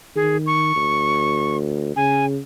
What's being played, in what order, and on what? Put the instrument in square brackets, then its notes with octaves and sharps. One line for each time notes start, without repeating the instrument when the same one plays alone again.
[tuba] D#3 [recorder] G#4
[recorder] C#6
[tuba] D2
[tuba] C#3 [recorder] G#5